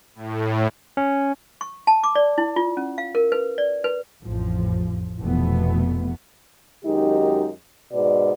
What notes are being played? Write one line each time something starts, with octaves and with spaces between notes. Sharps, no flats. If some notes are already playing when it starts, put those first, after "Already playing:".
A2
C#4
C#6
A5
D6
D5
E4
F4
C#4
F5
A#4
B4
D5
B4
A1 F2 F3
F1 F2 B2 E3 A3 B3
F#2 D#3 G#3 D#4 G4
G#2 B2 B3 D5